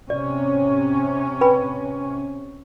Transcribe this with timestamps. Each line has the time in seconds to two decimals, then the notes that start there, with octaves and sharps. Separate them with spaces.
0.10 C3 C#4 D5
1.41 B4 G5 B5